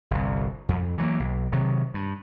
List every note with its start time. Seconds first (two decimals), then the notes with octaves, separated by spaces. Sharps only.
0.11 G1 C2
0.69 F2
0.98 E3 F#3 G3 A#3
1.20 B1
1.52 C3 D#3 F#3
1.94 G2